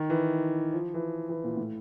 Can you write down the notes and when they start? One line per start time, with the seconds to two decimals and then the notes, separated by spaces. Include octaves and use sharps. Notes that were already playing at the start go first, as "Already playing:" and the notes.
Already playing: D#3
0.10 E3
0.72 F3
0.94 E3
1.29 E3
1.44 A#2
1.57 A2